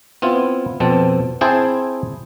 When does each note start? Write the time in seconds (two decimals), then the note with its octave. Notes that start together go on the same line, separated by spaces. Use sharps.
0.22 B3 C4 E4 F4
0.80 F2 B2 C4 A5
1.41 C4 E4 G#4 C5 G5 A5